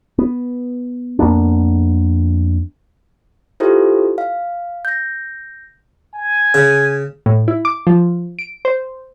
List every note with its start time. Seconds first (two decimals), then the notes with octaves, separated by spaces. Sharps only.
0.18 B3
1.19 F2 A#3 B3 D4
3.60 E4 F4 G4 A4 C5
4.18 F5
4.85 G6 A#6
6.14 G#5
6.54 C#3
7.26 A2
7.48 E4
7.65 D6
7.87 F3
8.39 D7
8.65 C5